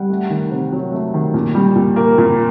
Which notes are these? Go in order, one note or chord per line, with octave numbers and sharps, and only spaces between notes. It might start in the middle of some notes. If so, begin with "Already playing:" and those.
Already playing: G3 F#5
A3
D#3
C3
F#3
A3
D#3
A#2
G3
A#2
A#3
A#2